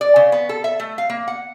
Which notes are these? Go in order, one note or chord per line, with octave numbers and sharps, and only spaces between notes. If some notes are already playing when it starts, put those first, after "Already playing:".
D5
C#3
B3
A4
E5
A3
F5
A#3
F#5